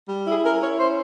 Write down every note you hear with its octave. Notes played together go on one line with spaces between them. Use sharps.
G3
E4 G#4
C#4 A#4
E4 C#5
C#4 C5